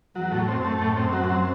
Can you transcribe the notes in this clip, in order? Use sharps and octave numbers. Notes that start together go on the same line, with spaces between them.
E2 F#3
A2
F#2 C4
A3
A2
C4
F#3
C4